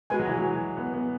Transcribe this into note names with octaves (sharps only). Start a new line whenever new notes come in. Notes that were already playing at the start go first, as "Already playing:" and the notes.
G#3 F#4 B4 G#5
F#3
E3
F#3
B3
B3